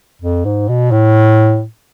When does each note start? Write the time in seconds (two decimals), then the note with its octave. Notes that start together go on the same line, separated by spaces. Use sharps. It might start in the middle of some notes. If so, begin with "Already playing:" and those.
0.22 F2
0.45 G#2
0.69 B2
0.92 A2